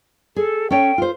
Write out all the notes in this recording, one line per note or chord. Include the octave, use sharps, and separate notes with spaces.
G#4 A4
C#4 A4 C#5 G5
F4 C5